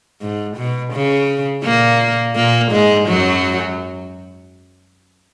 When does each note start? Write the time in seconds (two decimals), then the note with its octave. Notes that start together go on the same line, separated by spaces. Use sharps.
0.21 G#2
0.57 B2
0.93 C#3
1.64 A#2 A#3
2.36 A#2 A#3
2.71 G#2 G#3
3.08 F#2 F#3